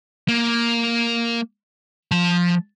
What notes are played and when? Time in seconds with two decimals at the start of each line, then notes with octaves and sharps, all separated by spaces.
0.28 A#3
2.11 F3 A5